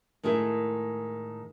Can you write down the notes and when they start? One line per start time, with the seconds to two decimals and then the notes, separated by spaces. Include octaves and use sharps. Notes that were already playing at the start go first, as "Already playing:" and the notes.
0.23 A2 D#3 G#3 E4 G#4